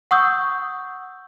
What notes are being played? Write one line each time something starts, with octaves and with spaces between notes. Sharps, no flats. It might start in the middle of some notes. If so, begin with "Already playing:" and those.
F#5 C#6 D#6 E6 G6